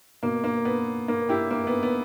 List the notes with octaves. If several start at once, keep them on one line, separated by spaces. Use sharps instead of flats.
B2 A#3
A#3
B3
A#3
E4 G4
A#3
B3
B3